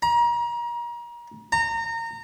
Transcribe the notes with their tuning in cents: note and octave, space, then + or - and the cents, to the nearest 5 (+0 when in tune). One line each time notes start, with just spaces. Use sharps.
A#5 +35
A#5 -25